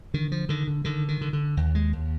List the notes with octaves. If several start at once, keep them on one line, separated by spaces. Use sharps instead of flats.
D3 D#3
F3
D3 D#3
D3
D3 D#3
D#3
D3
D3
D#2
G#3
D#2